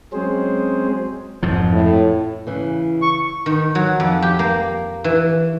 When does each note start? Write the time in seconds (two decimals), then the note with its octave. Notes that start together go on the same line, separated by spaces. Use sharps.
0.13 F#3 G#3 C4 C#4 G#4 C5
1.43 F2 G#2 F3
1.72 A2
2.47 C#3 E3
3.02 C#6
3.46 D#3
3.75 F#3
4.00 F2
4.22 G4
4.39 A#3
5.04 E3